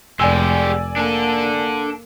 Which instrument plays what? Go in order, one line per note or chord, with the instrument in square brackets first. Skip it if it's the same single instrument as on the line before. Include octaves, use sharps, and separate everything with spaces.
[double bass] F1 [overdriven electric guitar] G#3 G4 [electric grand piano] D5 G#5 E6
[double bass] A#3 [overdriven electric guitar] D4 A4